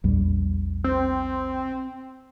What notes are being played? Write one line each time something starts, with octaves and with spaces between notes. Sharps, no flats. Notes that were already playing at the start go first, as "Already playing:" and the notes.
A#1 E2 G3
C4